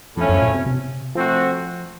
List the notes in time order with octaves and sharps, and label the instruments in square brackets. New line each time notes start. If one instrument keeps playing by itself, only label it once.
[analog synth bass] F2 [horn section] A2 F3 A3 C#4
[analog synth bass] F#2
A#2
C3
C3
[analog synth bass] F3 [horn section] A3 C4 F#4